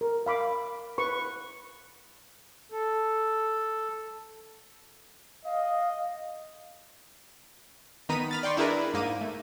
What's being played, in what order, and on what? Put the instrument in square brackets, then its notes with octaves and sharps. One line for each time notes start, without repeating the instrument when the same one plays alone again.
[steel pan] A#4
F5 B5 D6
B4 C#6
[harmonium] A4
[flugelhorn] D#5 [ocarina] F5
[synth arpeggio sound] D#3 B3 A#5 B6 D#7
B5 F6 A6
D5 G5 C6 C#6
D4 E4 G#4 A#4 B4 D5
G#2 A#3 D#7
A3